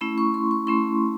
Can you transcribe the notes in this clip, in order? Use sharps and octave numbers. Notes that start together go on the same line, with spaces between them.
A3 C#4 E4 B5
C#6
C6
C#6
A3 C#4 E4 C6